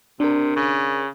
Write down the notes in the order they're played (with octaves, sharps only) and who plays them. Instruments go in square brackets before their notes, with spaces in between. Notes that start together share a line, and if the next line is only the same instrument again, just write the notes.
[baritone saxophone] C3 [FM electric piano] D4 A#4
[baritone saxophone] C#3